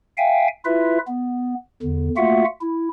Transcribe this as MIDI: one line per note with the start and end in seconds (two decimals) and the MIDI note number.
0.17 0.47 76
0.17 0.47 77
0.17 0.47 79
0.17 0.47 80
0.65 0.98 64
0.65 0.98 65
0.65 0.98 71
0.65 0.98 76
1.07 1.54 59
1.82 2.09 40
1.82 2.09 50
2.17 2.44 57
2.17 2.44 58
2.17 2.44 65
2.17 2.44 66
2.17 2.44 76
2.17 2.44 78
2.61 2.89 64